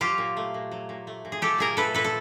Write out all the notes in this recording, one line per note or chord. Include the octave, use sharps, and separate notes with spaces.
F#3 F4 G4
A#2
A3
A#2
F#3
A#2
A3
A#2
G#4
F#3 G4 A4
A#2 G#4 A#4
A3 A4 B4
A#2 A4 B4
A4